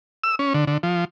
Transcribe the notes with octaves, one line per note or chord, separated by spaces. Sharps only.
E6
C#4
D3
D3
F3